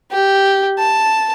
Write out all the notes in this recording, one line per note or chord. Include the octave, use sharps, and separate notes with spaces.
G4
A5